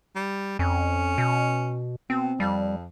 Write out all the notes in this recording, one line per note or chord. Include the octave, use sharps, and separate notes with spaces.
G3
F2 C#4
B2
B2 C4
F2 G3